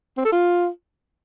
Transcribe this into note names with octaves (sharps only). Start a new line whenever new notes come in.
C4
A4
F4